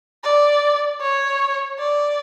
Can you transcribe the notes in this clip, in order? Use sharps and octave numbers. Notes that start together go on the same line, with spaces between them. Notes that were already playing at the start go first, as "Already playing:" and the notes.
D5
C#5
D5